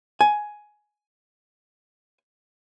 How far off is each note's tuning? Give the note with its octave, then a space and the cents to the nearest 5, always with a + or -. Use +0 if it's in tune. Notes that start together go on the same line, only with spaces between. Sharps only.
G#5 +10